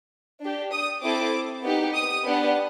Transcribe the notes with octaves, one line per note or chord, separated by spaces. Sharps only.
D4 G4
D#6
C4 E4 A4 D6
B3 D#4 G4
D#6
B3 D4 G4